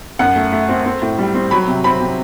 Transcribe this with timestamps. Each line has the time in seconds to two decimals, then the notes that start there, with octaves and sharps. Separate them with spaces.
0.19 F#2 F#5
0.36 A3
0.52 A3
0.69 C4
0.86 C4
1.02 A2
1.18 G3
1.35 C4
1.51 F#3 B5
1.68 C3
1.84 C4 B5
2.00 C3